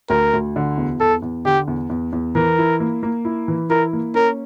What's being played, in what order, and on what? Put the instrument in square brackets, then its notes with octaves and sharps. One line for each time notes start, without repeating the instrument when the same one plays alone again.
[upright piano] D2 [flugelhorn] A#4
[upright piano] D2
D3
E2
[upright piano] E2 [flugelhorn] A4
[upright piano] E2
[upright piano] D3 [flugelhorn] G4
[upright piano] E2
E2
E2
[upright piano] E3 [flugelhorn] A#4
[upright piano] E4
A#3
A#3
E4
E3
[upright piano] E4 [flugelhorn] A#4
[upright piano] A#3
[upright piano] C#4 [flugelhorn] A#4